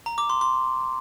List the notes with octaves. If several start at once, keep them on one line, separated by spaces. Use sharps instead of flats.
A#5
D6
C6
C6